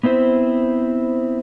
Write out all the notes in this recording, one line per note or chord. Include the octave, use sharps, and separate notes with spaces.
B3 C4 E4 C5